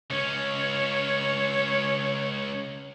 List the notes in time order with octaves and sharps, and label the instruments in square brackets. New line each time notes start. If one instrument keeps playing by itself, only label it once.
[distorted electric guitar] C#2 C#4 [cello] C#5